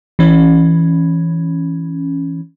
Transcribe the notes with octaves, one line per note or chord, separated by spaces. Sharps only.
E3 C#4